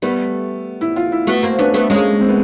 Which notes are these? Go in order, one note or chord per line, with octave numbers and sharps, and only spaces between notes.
G3 A3 B3
E4
F4
E4
A3 B3 F#4
A#3 C4
B3 C#4 D4
A3 B3
G#3 A#3 C#4
C4
B3